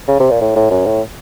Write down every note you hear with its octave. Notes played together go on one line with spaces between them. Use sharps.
C#3
C3
A#2
A2
A2
F#2
A2